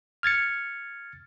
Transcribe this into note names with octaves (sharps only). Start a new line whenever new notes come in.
F6 G#6 A6 C#7